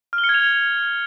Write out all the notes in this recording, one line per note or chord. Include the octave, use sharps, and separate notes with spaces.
F6
G7
C#7
G#6
F7